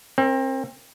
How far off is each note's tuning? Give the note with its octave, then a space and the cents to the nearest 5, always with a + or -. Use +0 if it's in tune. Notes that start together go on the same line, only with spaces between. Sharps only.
C4 +30 A#4 +0